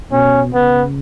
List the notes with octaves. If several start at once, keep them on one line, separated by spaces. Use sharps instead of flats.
B2 C#4
C#3 B3